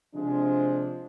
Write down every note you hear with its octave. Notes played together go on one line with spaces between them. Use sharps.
C3 F3 G#3 D4